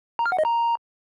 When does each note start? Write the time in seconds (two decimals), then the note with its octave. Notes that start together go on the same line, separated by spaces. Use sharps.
0.19 A#5
0.26 F6
0.32 F#5
0.38 D#5
0.45 A#5